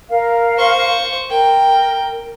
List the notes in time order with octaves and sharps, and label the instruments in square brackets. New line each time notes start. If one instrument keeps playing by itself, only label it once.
[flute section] A#4 F5
[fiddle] C5 C#6
[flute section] A#4 [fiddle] G5